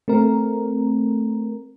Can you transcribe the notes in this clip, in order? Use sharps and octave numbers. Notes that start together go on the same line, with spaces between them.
A3 C4 A#4